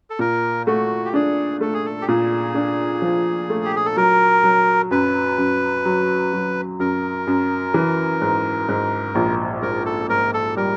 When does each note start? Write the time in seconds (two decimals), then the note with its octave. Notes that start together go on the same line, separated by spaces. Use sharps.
0.10 A4
0.19 A#2 A#4
0.67 A3 F#4
1.05 G4
1.14 D4 G#4
1.61 A3 A4
1.74 G#4
1.85 A4
2.02 G4
2.08 A#2 G#4
2.55 D4
3.02 F3
3.50 A3
3.65 G4
3.76 G#4
3.86 A4
3.97 F#3 A#4
4.44 F#3
4.91 F#2 B4
5.38 F#2
5.85 F#3
6.33 F#3
6.80 F#2 A#4
7.27 F#2
7.74 E3
8.21 G#2
8.69 G#2
9.15 A#1
9.62 G#2 A#4
9.86 A4
10.10 G#2 A#4
10.34 A4
10.57 G3 A#4